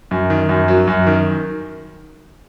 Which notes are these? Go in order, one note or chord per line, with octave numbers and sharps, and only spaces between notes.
F#2
D#3
F#2
F#3
F#2
D#3